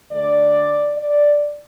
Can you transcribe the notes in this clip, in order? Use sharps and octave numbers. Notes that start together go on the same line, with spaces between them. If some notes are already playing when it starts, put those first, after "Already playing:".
D2 D3 A3 D5
D5